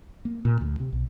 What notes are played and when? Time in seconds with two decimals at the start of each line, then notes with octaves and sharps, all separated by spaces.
0.25 A#3
0.45 A#2
0.61 D2
0.80 C3
0.93 B1